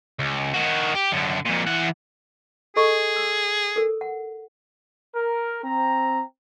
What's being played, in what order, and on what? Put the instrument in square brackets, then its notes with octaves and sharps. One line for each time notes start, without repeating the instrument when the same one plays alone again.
[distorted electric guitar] C#2
D#3 F#4
G4
F#2 D3
F2 A#2
E3 F#5
[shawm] G#4 [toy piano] A4 D#5 C#6
[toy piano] E6
A4 A#4
F#5
[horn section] A#4
C4 A#5